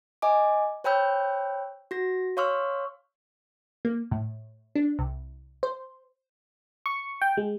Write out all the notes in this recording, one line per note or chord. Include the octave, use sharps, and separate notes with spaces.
D#5 G#5 D6
C5 C#5 G5 B5 E6 G6
F#4 A#6
C#5 F5 C6 C#6 E6 F6
A#3
A2
D4
C2
C5
C#6
G5
G#3